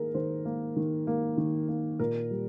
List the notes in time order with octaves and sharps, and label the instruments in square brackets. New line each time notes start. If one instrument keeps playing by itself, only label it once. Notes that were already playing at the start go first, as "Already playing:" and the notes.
Already playing: [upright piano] D#3 A#3 G#4 A#4
D#3 C5
A#3
D#3
A#3
D#3
A#3
A#2 A#4
G3